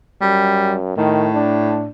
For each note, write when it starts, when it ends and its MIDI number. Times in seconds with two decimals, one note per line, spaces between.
0.21 0.94 42
0.21 0.76 55
0.97 1.89 45
0.97 1.28 51
1.34 1.89 62